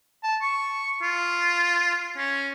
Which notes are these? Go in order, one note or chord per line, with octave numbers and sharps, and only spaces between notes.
A5
C#6
F4
C#4